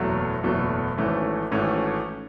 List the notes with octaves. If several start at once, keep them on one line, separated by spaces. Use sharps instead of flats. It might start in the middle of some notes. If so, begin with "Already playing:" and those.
Already playing: F#1 E2 B2 F#3 A3
F#1 E2 B2 F#3 A3
G#1 G#2 E3 A3 C#4
G#1 G#2 E3 A3 C#4